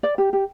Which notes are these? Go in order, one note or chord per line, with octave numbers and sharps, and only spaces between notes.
D5
G4
G4